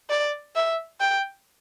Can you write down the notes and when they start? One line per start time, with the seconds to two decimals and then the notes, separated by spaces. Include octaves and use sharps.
0.10 D5
0.56 E5
1.01 G5